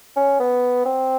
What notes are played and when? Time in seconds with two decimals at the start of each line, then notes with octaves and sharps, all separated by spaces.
0.16 C#4
0.40 B3
0.86 C4